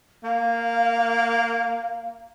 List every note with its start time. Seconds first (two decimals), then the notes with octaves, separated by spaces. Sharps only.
0.24 A#3 F5